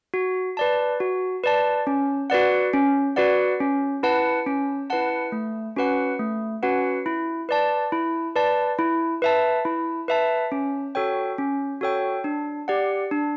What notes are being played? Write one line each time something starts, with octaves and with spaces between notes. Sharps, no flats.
F#4
B4 D5 A5
F#4
B4 D5 A5
C#4
F#4 B4 D5 F#5
C#4
F#4 B4 D5 F#5
C#4
E4 B4 F#5 A5
C#4
E4 B4 F#5 A5
A3
C#4 F#4 B4 F#5
A3
C#4 F#4 B4 F#5
E4
B4 D5 A5
E4
B4 D5 A5
E4
B4 E5 A5
E4
B4 E5 A5
C#4
F#4 A4 C#5 G5
C#4
F#4 A4 C#5 G5
D4
G4 D5 F#5
D4